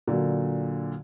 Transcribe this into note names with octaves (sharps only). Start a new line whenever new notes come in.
A#2 D3 F#3